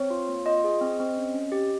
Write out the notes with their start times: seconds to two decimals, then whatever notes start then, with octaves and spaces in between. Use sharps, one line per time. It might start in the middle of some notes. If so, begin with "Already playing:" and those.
Already playing: C4 C#5
0.10 F4
0.29 A#3
0.46 F4 D#5
0.64 G#4
0.81 C4
1.00 C4
1.17 C#4
1.34 C#4
1.52 G4